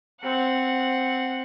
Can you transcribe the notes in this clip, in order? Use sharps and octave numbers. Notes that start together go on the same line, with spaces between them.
C4 F#5